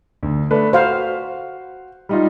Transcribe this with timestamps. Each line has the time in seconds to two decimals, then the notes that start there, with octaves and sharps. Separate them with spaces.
0.23 D2
0.51 A3 B4 D5
0.73 F#4 C5 F5
2.09 G3 D#4 F4